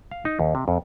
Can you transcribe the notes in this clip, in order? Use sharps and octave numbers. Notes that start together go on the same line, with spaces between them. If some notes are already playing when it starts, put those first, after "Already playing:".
F5
D#4
D#2
C3
F2